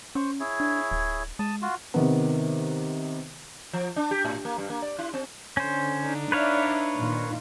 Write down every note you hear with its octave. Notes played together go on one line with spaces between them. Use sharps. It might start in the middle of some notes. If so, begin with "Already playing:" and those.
C#4 C5 C#6
E4 G#4 C#5
D4
D1
G#3 A5 D#6
F4 F#4
C3 D#3 B3
F3
D4
G4
A2
A#3
G2
A#3
D5
E4
C4
D3 C#4 C5
D4 D#4
B4 C#5 D5 E5 F5
A#2 D#3 F4